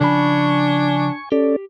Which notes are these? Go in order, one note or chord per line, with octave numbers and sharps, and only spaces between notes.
C#3 F3 D4 G#5 B5 C#6
C#4 G4 A4 D5